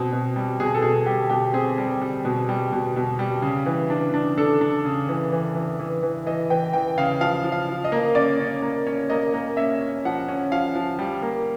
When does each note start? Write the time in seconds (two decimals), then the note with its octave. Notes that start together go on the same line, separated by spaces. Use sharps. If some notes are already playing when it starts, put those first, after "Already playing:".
Already playing: B2 C4
0.12 B2
0.36 G3
0.60 B2 G#4
0.74 A4
0.82 B2 G#4
1.06 G3 G4
1.30 B2 G4
1.53 C4 G#4
1.78 G3
2.02 G3
2.25 B2
2.49 G3
2.72 B2
2.96 B2
3.19 G3
3.42 C#3
3.66 E3
3.90 D4
4.14 D4
4.38 D4 A4
4.61 D4
4.85 C#3
5.09 E3
5.32 E3
5.55 E3
5.80 E3
6.03 E3
6.26 E3 D#5
6.50 E3 G5
6.73 E3 G5
6.98 C#3 F5
7.20 F3 F5
7.44 F3
7.52 F5
7.69 F3
7.84 D#5
7.92 A#3
8.15 C#4 D5
8.40 C#4
8.62 A#3
8.87 C#4
9.10 A#3 D#5
9.34 A#3
9.57 C#4 E5
9.81 C#4
10.05 F3 F#5
10.28 C#4
10.52 F3 F5
10.76 F3
10.99 G3
11.22 A#3